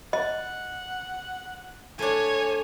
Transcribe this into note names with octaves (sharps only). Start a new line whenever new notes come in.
D#5 F#5
A3 D4 C#5 G#5